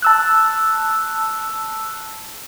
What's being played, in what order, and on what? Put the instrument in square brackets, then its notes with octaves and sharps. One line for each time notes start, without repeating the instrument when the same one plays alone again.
[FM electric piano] A5 E6 F#6